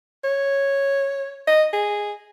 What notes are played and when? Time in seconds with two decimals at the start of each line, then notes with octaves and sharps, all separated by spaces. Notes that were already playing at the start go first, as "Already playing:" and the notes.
0.24 C#5
1.47 D#5
1.73 G#4